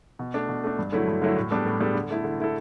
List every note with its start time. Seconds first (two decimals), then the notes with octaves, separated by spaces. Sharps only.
0.19 B2
0.34 A3 D4
0.49 B2
0.64 A3 D4
0.79 G2
0.92 D3 F#3 A3 E4
1.07 G2
1.22 D3 F#3 A3 E4
1.36 A2
1.51 G3 B3 D4 A4
1.66 A2
1.80 G3 B3 D4 A4
1.95 D3
2.10 A3 E4 A4
2.24 D3
2.40 A3 E4 A4